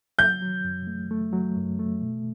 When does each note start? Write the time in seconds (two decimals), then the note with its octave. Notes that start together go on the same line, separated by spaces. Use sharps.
0.19 F#3 G6
0.42 F#3
0.64 F#2
0.87 A3
1.11 A3
1.33 F#3
1.56 F#2
1.79 A3
2.01 B2